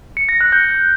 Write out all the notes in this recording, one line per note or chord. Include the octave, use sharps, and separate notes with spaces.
C#7
A#6
F#6
G6